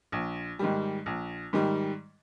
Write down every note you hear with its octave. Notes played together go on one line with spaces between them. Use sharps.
A#1
G#2 D#3 G3
A#1
G#2 D#3 G3